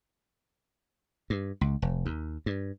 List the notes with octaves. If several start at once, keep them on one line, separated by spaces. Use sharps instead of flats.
G2
C#2
F1
D#2
G2